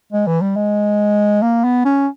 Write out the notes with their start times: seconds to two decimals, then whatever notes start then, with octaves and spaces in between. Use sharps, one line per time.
0.13 G#3
0.27 E3
0.41 G3
0.56 G#3
1.42 A#3
1.64 B3
1.85 C#4